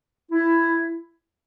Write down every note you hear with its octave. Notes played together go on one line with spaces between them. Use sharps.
E4